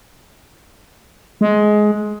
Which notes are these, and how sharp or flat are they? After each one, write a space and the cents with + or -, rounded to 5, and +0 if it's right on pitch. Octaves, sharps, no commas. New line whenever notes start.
G#3 +15